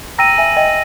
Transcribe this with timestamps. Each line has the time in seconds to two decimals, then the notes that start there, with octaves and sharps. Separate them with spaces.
0.18 G5 A#5 E6 A#6 D#7
0.38 E5 G#5
0.57 D#5 G5